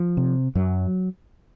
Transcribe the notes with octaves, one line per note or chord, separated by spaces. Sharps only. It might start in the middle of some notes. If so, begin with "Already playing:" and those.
Already playing: F3
C3
F#2 F#3